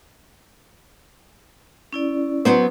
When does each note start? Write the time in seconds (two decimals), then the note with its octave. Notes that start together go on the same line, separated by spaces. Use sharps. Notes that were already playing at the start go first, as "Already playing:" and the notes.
1.93 C#4 E4 D5
2.45 F#3 B3 C5